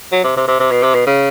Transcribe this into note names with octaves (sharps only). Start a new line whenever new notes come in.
F#3
C3
C3
C3
C3
B2
C3
B2
C#3